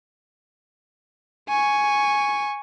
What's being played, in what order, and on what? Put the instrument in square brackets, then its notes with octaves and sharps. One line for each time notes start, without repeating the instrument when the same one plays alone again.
[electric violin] G#5 C#6